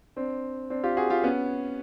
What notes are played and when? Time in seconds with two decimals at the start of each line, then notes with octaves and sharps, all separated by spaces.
0.16 C4 D4
0.70 C4 D4
0.84 F4 G4
0.97 F#4 G#4
1.10 F4 G4
1.24 B3 C#4